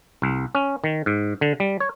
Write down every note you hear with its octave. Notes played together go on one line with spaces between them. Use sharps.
C2
C#4
D#3
G#2
D3
G3
C#5